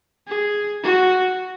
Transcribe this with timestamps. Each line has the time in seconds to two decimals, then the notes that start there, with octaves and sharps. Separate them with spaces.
0.28 G#4
0.83 F#4